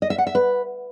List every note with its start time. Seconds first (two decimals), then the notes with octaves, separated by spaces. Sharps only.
0.02 D#5
0.10 E5
0.18 F#5
0.27 E5
0.35 B4